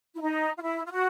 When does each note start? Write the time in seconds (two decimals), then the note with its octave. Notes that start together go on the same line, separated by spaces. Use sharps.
0.15 E4
0.21 D#4
0.57 F4
0.63 E4
0.86 F4
0.91 F#4